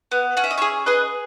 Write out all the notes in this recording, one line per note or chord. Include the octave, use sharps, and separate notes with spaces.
B3
C#4 F#5
E5
D#5
G#4 C#5 E5
G#4 B4 D#5